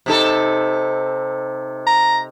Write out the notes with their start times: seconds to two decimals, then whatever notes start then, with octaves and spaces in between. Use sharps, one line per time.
0.06 C3 D#4 A4
1.87 A#5